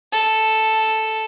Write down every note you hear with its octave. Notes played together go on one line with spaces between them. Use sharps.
A4